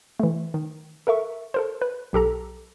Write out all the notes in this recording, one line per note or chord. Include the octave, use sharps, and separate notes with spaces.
E3 A3
D#3
A4 A#4 E5 C#6
A4 A#4 C5
B4
B1 G4 A4 A#5